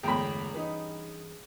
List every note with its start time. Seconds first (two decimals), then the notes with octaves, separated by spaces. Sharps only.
0.03 G1 E2 A2 G#3 G#4 G5 B5
0.54 G2 E3 C#4 D#4 B4